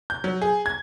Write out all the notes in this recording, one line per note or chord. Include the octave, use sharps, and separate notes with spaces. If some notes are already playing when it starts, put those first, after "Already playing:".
G6
F#3
G#4
G#6